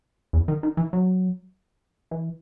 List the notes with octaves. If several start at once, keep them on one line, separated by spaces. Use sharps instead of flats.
E2
D#3
D#3
E3
F#3
E3